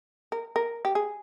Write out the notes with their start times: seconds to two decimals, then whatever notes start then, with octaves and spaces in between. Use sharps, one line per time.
0.32 A#4
0.56 A#4
0.85 G4
0.95 G#4